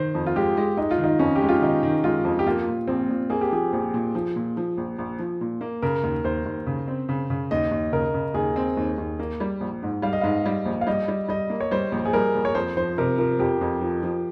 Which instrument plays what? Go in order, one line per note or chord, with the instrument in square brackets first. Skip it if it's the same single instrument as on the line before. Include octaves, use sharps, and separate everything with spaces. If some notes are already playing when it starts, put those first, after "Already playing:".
Already playing: [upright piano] D#3 [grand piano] C5
[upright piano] F2
[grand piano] F4
[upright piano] G#3 [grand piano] G4
[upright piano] G#3
[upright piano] G#3 [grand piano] D#4
[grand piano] F4
[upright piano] D#3
[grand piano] D#4
[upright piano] F2 [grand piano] C#4
[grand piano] G4
[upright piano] G#3
[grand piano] F4
[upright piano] D#3 [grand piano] D#4
[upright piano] D#3
[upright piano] G#3 [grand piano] F4
[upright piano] F2
[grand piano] G4
[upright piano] A#3 [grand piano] F4
[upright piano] A#2
[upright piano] A#1 [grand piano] C4
[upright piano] A#2
[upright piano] A#3 [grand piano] G#4
[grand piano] G4
[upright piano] F3 [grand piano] G#4
[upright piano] A#1
A#2
F3
A#2
F3
A#1
A#1
F3
A#2
A#3
[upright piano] C#3 [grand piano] A#4
[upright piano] D#2
[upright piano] D#2 [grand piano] C5
[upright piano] D#2
C#3
C4
C#3
C#3
[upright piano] D#2 [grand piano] D#5
[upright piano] D#2
[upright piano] C#3 [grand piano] A#4
[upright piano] C#3
[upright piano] D#2 [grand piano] G#4
[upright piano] C4
D#2
D#2
A#3
G3
A#1
G#2
[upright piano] G3 [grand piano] F5
[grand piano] D#5
[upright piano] G#2 [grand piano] F5
[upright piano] G3
A#1
[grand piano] F5
[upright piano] G3 [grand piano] D#5
[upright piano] G3
[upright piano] G3 [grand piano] D#5
[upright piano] A#3
[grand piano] C#5
[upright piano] G3 [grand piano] C5
[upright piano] A#1
[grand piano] G#4
[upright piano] G3 [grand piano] A#4
[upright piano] A#1
[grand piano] C#5
[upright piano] F2 [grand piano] C5
[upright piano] F3 [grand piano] C5
[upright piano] C3 [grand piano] A#4
[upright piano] F3 [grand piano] A#4
[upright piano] F2 [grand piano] G4
[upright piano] F2
F3
F3